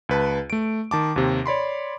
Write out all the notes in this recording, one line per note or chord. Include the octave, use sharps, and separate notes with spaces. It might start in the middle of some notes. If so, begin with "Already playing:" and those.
C#2 B4 A5
A3 D7
D#3 A5 D6
D#2 C3
C#5 D5 B5 C6